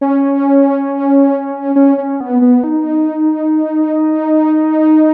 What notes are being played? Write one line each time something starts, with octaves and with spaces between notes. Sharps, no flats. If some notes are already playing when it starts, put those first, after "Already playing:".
C#4
C#4
C#4
B3
B3
D#4